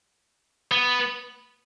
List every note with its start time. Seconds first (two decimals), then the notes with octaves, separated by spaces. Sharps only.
0.71 B3